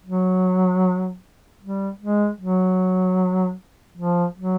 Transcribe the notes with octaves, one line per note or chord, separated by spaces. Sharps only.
F#3
G3
G#3
F#3
F3
F#3